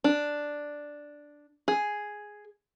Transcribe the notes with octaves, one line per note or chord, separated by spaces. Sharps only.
D4
G#4